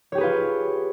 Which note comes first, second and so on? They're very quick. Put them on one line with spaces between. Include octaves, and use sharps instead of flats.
C#5 G4 G#4 B4 F4